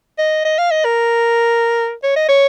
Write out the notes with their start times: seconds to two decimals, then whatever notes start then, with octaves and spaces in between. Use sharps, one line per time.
0.18 D#5
0.45 D#5
0.58 F5
0.71 D#5
0.85 A#4
2.03 C#5
2.16 D#5
2.29 C#5